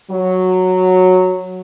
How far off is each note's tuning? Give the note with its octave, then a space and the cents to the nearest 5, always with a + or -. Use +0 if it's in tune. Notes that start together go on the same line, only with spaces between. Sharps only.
F#3 -5